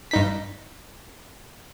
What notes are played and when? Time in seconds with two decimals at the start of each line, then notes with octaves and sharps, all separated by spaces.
0.11 G2 D#4 B6